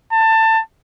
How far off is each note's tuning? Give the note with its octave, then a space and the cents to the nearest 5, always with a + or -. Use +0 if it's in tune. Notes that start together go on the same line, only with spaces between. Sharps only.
A5 +20